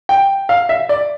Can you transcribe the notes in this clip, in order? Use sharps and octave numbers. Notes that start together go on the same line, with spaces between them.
G5
F5
E5
D5